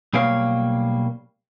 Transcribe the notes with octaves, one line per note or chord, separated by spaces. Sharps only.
B1 G3 A#3 C#5 F5